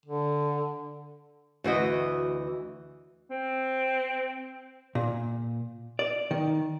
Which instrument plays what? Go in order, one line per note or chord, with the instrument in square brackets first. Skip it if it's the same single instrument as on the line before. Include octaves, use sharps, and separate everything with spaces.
[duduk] D3
[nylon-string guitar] D2 E3 F#4 D#5
[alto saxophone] C4
[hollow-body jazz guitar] A#2
D5
D#3